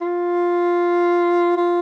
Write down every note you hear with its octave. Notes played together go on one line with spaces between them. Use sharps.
F4
F4